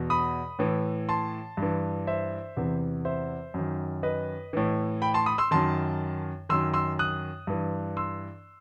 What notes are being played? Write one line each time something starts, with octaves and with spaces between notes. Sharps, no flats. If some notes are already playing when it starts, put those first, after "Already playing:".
Already playing: E2 B2
B5 D#6
A2 E3
A5 C6
G2 E3
C5 E5
E2 C3 E3
C5 E5
F#2 D#3
B4 D#5
A2 E3
G5 B5
A5 C6
B5 D#6
C6 E6
F#2 D#3 A5 C6
F#2 D#3 C6 E6
C6 E6
D#6 F#6
G2 E3
C6 E6